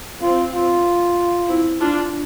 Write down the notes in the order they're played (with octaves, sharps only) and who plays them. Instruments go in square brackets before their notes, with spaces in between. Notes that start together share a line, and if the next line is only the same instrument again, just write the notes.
[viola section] C4 [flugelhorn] F4
[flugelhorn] F4
[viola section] C4 E4
D4 F4